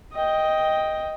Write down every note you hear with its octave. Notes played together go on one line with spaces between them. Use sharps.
D#5 G5